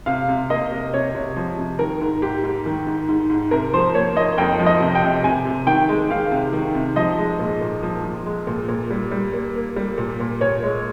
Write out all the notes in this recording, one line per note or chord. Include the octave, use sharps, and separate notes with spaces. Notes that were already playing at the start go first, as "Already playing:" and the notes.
C3 F5
C3
A#3 D#5
C3
C3 C#5
C3
F3
C3
D#3 A#4
G#2
G#2 G4
G#2
D#3
G#2
G#2
G#2
C3 A#4
F3 C5
A#3 C#5
A#3 D#5
F2 G5
F3
D#5
C3
G5
C3
C3 G#5
C3
D#3 G5
G#3
D#3 F5
C3
D#3
C3
F3 D#5
G#3
A#2
A#2
F3
F3
G#3
A#2
A#2
G3
G3
A#3
A#3
G3
A#2
A#2
A#2 C#5
G#3